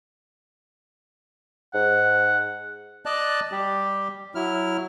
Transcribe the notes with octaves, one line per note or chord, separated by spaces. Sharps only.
G#2 F#5
D5 D#5 A5 F#6
G3 G4
F#3 E4 F6